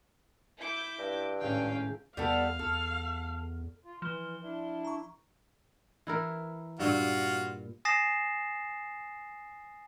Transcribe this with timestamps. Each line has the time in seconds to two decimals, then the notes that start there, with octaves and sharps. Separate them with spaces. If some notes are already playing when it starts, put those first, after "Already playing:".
0.58 E4 D6 G6
0.98 G2 E6 A#6
1.40 G#1 C#2 A2 C#4 F5 G5
2.17 E2 G3 B3 A4 F5
2.59 E2 A4
3.85 F4
4.02 E3 F3 G7
4.42 D4 E4
4.85 A#5 C#6
6.07 E3 E4 A#4
6.79 G2 A#2 F4 F#4
7.85 G#5 D#6 A6 A#6 C7 E7